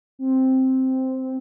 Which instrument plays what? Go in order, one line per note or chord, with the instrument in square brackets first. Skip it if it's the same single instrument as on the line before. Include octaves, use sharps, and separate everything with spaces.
[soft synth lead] C4